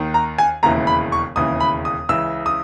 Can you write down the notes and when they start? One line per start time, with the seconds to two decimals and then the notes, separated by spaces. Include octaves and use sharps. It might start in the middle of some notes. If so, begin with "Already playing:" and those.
Already playing: D#2 D#3
0.14 A#5
0.38 G#5
0.63 E1 D#2 C#3 E3 A#5
0.87 B5
1.12 C#6
1.36 E1 D#2 C#3 E3 D#6
1.60 B5
1.85 D#6
2.09 C#2 C#3 E3 E6
2.46 D#6